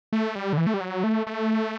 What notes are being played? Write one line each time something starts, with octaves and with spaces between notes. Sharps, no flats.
A3
G3
D3
E3
A3
G3
F#3
A3
A3